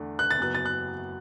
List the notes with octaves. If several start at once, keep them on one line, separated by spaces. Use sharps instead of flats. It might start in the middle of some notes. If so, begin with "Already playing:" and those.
Already playing: E2 D3 A3 D4
F#6
A6
F#1 F#2 F#3 B3 F#6
A6
F#6